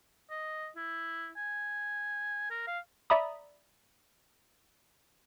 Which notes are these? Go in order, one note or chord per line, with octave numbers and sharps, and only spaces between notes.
D#5
E4
G#5
A#4
F5
D5 E5 A#5 B5 D#6